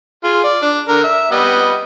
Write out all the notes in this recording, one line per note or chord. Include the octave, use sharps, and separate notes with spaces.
F4 G#4
D5
D4
D3 A#4
E5
G3 B3 D#5